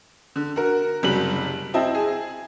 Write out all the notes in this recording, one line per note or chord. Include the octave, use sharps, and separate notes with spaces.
D3
F#4 A#4
F#1 C3 F#3 G3 F#7
C4 E4 D#5 A5
G#4